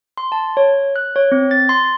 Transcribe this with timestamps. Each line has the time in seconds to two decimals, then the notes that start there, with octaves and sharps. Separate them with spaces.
0.18 C6
0.32 A5
0.57 C#5
0.96 F#6
1.16 C#5
1.32 C4
1.51 A6
1.69 C6